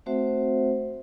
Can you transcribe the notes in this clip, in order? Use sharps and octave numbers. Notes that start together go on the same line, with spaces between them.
A3 C4 F#4 C5 E5 F#5